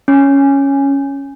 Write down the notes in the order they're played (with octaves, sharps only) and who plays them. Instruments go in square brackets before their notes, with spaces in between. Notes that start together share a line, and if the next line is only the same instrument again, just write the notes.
[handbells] C#4